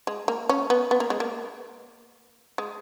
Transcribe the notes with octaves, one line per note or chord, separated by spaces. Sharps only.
G#3
A#3
C#4
B3
B3
A#3
G#3
A#3
G#3